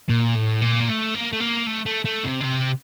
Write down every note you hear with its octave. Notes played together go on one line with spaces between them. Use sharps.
A#2
A2
A#2
A#3
A3
A#3
A3
A#3
A3
A3
A3
C3
D3
C3